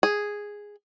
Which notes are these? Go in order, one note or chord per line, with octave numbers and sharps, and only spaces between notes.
G#4